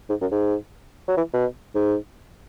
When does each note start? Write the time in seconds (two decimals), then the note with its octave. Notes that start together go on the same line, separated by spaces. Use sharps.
0.09 G#2
0.21 F#2
0.31 G#2
1.08 F#3
1.17 E3
1.33 B2
1.75 G#2